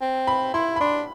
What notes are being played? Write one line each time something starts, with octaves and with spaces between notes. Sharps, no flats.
C4
B5
E4 C6
B5
D4 C6